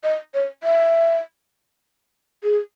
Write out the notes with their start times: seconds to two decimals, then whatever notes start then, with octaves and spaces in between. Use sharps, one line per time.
0.04 D#5
0.34 C#5
0.63 E5
2.43 G#4